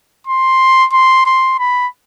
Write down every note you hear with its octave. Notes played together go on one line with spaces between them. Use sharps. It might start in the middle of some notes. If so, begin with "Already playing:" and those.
C6
C6
C6
B5